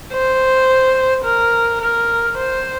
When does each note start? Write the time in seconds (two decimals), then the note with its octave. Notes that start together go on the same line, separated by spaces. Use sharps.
0.13 C5
1.25 A#4
1.81 A#4
2.37 C5